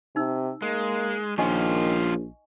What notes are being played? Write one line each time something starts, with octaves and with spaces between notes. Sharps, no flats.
C3 D#4 E6
G#3 A#3
A#1 D#3 F3 C#4 F4 D#5 G#5 C#6